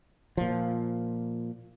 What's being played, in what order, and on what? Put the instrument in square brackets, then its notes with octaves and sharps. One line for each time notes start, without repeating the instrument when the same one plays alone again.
[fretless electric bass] A#2 F3